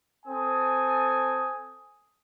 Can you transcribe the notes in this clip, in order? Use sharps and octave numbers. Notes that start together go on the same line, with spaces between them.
C4 A4 G#5 D#6